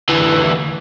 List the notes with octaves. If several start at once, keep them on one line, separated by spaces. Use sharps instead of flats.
D2 E3